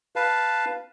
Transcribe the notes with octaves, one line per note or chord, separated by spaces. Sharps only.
B4 F5 A5